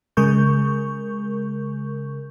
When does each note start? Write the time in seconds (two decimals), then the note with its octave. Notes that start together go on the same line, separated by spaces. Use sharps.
0.17 C#3 G#3 A#4 C#6 G6